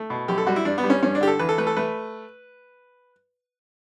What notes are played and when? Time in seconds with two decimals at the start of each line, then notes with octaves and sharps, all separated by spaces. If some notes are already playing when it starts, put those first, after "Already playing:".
Already playing: A3
0.10 B2
0.28 F#2 G4
0.38 A4
0.47 G3 F#4
0.56 E4
0.65 G2 D4
0.78 B3
0.84 G3
0.90 C#4
1.03 G2 C#4
1.15 D4
1.21 D3 G4
1.27 A4
1.39 E2 B4
1.49 A4
1.58 A3 B4
1.67 A4
1.77 A3 B4